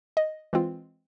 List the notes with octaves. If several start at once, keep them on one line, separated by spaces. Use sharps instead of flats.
D#5
E3 G#3 C4 F4